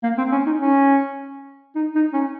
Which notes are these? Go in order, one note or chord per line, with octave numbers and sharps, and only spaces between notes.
A#3
C4
C#4
D#4
C#4
D#4
D#4
C#4